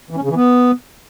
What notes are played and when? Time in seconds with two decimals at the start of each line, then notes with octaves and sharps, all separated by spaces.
0.10 E3
0.17 C#4
0.23 C#3
0.29 E3
0.35 B3